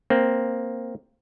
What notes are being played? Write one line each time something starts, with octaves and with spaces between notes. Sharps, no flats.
A#3 C4